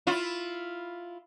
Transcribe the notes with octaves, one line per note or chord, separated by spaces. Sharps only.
E4 F4